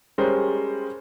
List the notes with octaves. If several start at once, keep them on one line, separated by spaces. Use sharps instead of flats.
G3 G#3 C#4 A#4 C5